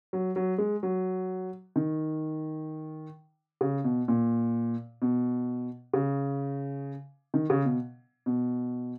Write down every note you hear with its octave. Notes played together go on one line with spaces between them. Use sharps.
F#3
F#3
G#3
F#3
D#3
C#3
B2
A#2
B2
C#3
D#3
C#3
B2
B2